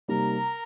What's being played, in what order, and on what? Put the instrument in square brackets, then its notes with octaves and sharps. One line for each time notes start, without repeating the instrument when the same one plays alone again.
[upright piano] C3 G3 A#3 D#4 [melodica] A#4 A#5